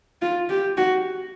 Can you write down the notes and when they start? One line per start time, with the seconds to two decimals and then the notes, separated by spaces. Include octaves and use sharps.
0.22 F4
0.50 G4
0.78 F#4